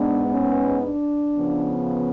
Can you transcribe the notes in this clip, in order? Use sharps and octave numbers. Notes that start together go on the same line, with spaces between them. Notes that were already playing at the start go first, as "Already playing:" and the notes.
Already playing: G#2 G#3 B3 D4
C#4
D4
C#3 F3 B3